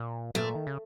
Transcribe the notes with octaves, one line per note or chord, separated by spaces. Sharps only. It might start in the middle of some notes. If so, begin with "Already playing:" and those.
Already playing: A#2
A#2 A3
D#3
C#3